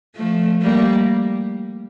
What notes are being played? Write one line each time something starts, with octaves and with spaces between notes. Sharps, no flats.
F3 A3
G3 A#3